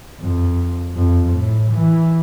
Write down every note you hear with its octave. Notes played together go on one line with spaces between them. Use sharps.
F2
F2
A2
E3